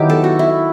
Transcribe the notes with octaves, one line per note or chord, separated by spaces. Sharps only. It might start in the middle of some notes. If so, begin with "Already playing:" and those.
Already playing: D#3 F#3 B3 E4 G4
A4
F#4
E4